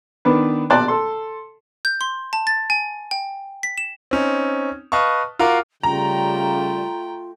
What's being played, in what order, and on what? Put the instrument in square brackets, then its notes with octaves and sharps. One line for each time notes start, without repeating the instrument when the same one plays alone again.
[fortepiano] D#3 B3 D4 B4
A#1 B2 D5 A5 C6 F#6
A4 C6
[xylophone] G6
C6
A5
A6
G#5
G5
B6
E7
[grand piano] C4 C#4 D#4
B4 D#5 F5 A5 C#6
F4 F#4 A#4 F5 D6
[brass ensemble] C#3 G3 [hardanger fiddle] A3 G5 [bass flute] F4 [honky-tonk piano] A#5